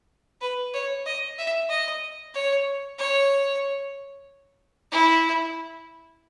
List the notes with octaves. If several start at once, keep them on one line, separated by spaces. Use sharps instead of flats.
B4
C#5
D#5
E5
D#5
C#5
C#5
E4